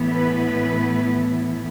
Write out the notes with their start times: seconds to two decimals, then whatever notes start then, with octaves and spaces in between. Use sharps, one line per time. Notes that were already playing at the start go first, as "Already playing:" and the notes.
Already playing: A2 E3 B3 E4
0.13 B4